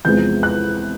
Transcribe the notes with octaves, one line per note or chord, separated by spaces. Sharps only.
E2 C3 F3 G#3 G6
F#6